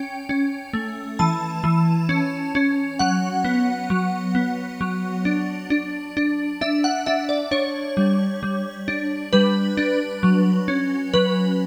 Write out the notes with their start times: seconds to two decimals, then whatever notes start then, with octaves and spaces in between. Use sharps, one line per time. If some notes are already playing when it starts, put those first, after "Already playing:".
Already playing: C#4 G5
0.29 C#4
0.73 A3
1.19 E3 A5
1.64 E3
2.09 C#4
2.55 C#4
2.99 F#3 F#5
3.44 B3
3.90 F#3
4.35 B3
4.81 F#3
5.25 D4
5.70 D4
6.17 D4
6.61 D4 E5
6.84 F#5
7.06 D4 E5
7.29 D5
7.51 D4 C#5
7.97 G3
8.43 G3
8.88 D4
9.33 G3 B4
9.77 D4
10.23 F#3
10.68 C#4
11.14 F#3 B4